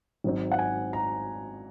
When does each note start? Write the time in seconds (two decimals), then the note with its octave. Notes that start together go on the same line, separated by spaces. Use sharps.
0.24 G#1 G#2 F#3 C4
0.52 F#5
0.59 G#5
0.93 A#5